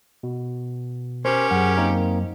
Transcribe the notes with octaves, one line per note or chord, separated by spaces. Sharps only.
B2
C#4 G4 A#4 C5
F#2 G#4 F#5
A#3 C4 D#4